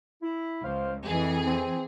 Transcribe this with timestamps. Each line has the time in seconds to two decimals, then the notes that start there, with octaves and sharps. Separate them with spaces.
0.21 E4
0.62 C#2 C5 F5
1.05 F2 E3 G#4
1.46 C4